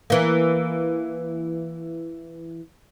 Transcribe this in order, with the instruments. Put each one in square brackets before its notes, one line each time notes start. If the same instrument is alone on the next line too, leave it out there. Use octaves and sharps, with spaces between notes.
[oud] E3 A#3